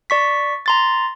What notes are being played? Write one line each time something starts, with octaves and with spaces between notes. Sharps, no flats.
D5 C#6 B6
A#5 C6 A6